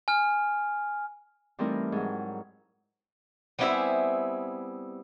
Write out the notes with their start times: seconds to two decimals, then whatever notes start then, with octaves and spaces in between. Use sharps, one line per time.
0.08 G#5 F6
1.59 E3 G3 A3 C4 D#4 A#4
1.92 G#2 F#3
3.59 G3 B3 C4 E4 G#4 E5